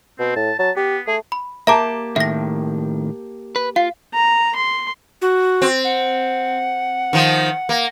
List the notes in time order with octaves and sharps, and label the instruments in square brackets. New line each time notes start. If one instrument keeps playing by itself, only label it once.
[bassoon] B2 [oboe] C4
[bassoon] A2 [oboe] A5
[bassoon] F#3 [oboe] A5
[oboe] B3 [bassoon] G4
[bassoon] A3 [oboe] G#4
[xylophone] B5
[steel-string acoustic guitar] A#3 G4 A5 [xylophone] E5 A#5 D6
[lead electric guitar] A2 D#3 [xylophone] E5 A#6
[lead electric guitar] B4
[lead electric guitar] F4 [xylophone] F5
[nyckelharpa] A#5
C6
[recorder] F#4
[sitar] C4
[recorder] F#5
[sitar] D#3 F3
A#3